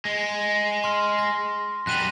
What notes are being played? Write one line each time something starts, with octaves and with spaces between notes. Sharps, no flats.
G#3
C6 F6
A#6
F#2 G3 F#6 D#7 F#7